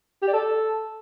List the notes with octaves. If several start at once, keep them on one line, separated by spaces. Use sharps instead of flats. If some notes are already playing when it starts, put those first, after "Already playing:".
G4
D5
A4